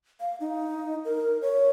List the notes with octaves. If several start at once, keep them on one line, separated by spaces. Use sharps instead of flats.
F5
D#4
A#4
C#5